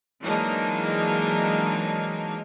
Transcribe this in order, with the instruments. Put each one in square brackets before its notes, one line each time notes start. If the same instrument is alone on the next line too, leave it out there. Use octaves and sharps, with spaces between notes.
[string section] E3 F#3 G#3 A#3 D4 D#4